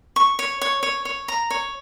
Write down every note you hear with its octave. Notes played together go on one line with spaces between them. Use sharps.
C#6
C#5
C#5
C#5
C#5
A#5
C#5